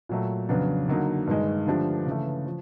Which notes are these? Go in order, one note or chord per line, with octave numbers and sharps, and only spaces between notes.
A#2 F#3 A3
F2 C#3 F#3 B3 D4
D3 F#3 A#3 D#4
G2 D#3 G#3
D3 F3 A3 D4 G4
C#3 E3 A3
F3